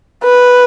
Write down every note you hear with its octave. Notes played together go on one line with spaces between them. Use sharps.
B4